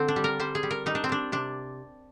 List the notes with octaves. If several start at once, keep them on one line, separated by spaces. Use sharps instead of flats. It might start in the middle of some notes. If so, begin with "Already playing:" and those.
Already playing: D3 C4
D4
G3
A#4
G3 C5
G#4
G3
A#4
G3 D#4
D4
C4
G3 D4
C3 D4